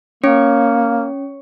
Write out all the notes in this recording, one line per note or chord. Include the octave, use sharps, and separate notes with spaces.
A#3 C#4 C#5